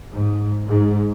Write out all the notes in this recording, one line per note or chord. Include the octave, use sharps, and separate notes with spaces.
G#2
G#2